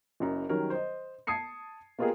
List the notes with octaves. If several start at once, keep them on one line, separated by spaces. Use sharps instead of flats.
F#1 F#2 A#5
D#3 F#3 G3 C#4 A#4
C5 D#5
A5 D#6 G#6 C7 C#7
A#3 B3 F4 G4 G#4 A#4